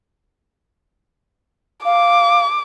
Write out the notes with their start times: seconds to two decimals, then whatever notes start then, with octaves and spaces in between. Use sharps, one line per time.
1.85 F5 D6